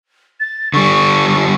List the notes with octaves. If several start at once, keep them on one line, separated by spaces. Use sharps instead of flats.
A6
D3 G3 C#6